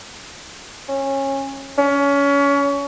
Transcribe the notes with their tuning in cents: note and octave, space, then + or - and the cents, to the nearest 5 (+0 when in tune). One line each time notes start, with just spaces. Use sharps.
C#4 -25
C#4 +25